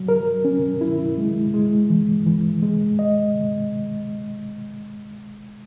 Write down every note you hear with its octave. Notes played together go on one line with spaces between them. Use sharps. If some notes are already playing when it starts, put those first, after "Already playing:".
Already playing: F#3
A#4
C#4
E4
G#3
G#3
E3
E3
G#3
D#5